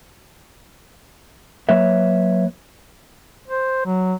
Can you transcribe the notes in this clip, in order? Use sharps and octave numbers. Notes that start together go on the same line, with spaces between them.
F#3 A#3 B4 C#5 E5
C5
F#3